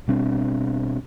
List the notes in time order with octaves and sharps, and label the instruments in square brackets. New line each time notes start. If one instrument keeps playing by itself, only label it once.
[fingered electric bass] B2 G3 C4 D4